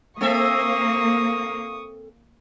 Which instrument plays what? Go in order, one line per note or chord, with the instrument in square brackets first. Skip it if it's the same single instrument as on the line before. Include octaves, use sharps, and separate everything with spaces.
[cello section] A#3 [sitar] C4 A4 E5 [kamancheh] C#6 D#6